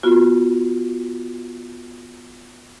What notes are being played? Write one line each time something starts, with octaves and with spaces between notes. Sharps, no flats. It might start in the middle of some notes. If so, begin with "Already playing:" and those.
B3 F4 F#4